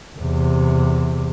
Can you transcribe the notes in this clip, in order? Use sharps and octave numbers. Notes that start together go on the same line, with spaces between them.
E2 C3